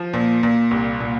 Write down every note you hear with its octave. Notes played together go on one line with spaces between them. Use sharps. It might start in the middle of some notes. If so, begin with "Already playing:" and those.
Already playing: F3
A#2
A#2
C2
A#2